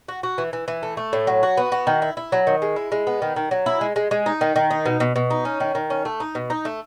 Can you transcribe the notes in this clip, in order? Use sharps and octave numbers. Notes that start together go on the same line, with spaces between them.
F#4
F#4
E3
E3
E3
A3
A3
A2
F#3
F#4
B3
F#4
D#3
E4
E4
F#3
D#3
G#3
E4
G#3
B3
D#3
D#3
F#3
E4
G#3
G#3
G#3
D#4
D#3
D#3
D#4
B2
B2
B2
D#4
C#4
D#3
D#3
C#4
A3
D#4
B2
D#4
A3